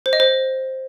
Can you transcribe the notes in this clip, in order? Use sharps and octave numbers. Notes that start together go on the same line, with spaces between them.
C5
D#5
C5